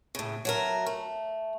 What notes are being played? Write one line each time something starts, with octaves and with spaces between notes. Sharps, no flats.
A2 C#3
F#3 A3 A#4
A3